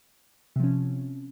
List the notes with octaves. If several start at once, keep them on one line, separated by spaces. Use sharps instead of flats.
C3 F3 C#4